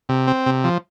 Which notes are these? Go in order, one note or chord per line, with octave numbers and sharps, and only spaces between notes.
C3
C4
C3
F3